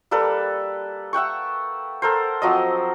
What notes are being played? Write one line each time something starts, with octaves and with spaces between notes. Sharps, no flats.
G3 A#3 A4 B4
E5 F#5 G5 C#6
A4 A#4 C5
F3 F#3 C4 D#5